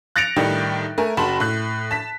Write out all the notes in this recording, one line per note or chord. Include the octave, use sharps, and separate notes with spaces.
F#6 A6 A#6 C#7 D7 F7
A2 D#3 G3 D4 G4
A3 A#4 G#5
F#1 F#4 A5 B5 C6
A2 F#6
A5 B6